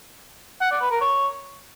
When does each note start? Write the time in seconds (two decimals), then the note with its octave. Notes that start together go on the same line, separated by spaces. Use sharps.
0.61 F#5
0.71 D5
0.81 B4
0.91 A#4
1.01 C#5